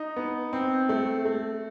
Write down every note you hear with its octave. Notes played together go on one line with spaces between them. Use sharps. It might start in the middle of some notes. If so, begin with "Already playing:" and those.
Already playing: D#4
B3
C4
A3
A3